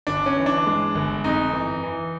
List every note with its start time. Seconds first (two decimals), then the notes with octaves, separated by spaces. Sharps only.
0.07 G1 D4
0.26 C#4
0.36 E3
0.46 D4
0.66 G#3
0.95 G1
1.24 F2 D#4
1.53 E3
1.83 E3